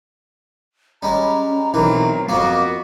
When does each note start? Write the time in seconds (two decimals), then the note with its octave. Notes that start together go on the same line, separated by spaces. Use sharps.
1.03 G3 G#3 C#4 A#5
1.74 B1 E3 F#3 C4 A#4
2.29 F2 A#3 B3 F#4 D6